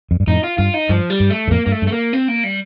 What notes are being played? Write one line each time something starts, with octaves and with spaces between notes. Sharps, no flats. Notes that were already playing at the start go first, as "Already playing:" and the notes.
F2
G2
F2 A2 D#4
F4
G2 F4
D#4
G2 F3
G3
G2
A3
G2
F2 A2 A#3
G2 A#3
A3
G2
A3
A#3
C4
A#3
G3